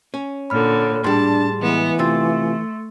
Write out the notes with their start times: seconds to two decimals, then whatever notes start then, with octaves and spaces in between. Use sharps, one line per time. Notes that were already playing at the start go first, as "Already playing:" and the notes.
0.14 C#4
0.50 A#2 D3 C#5 B5 F6
1.04 A2 G3 D4 G#4 A5 C6
1.60 E3 G#3 B3
1.99 C3 A3 F4 C6 E6 A6